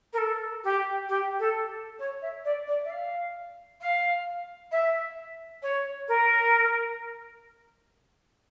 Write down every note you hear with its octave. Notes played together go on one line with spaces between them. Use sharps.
A#4
A4
G4
G4
A4
C#5
E5
D5
D5
E5
F5
F5
E5
C#5
A#4